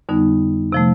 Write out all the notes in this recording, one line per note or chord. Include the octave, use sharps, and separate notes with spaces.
F2 D3 G3 B3 D#4
C3 F3 A3